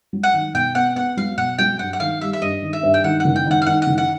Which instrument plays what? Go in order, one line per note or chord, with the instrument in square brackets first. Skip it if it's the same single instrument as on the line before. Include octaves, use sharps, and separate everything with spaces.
[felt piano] F#3
[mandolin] F#5
[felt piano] D#3
[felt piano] B2 [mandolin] G5
[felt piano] B3 [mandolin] F#5
[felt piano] B3 [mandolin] F#5
[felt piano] F#3 [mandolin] F5
[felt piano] B2 [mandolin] F#5
[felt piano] F#3 [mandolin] G5
[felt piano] G2 [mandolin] F#5
[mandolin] F#5
[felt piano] D#3 [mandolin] F5
[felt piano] G3 [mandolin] E5
[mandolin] E5
[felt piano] G2 [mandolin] D#5
[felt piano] D#3
[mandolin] E5
[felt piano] G2
[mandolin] G5
[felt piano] D#3 [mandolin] F#5
[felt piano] F#1 [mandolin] F#5
[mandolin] G5
[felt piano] D#3 [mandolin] F#5
[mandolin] F5
[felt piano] D#3 [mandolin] F#5
[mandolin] F#5
[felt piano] F#1
[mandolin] F#5